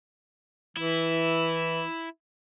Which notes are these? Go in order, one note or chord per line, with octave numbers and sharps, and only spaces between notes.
E3 E4